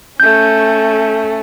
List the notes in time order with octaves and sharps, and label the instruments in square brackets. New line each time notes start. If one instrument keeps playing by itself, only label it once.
[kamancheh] A3 C#4 [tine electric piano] G6